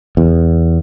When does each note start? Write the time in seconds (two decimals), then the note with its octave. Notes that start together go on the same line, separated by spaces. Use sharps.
0.17 E2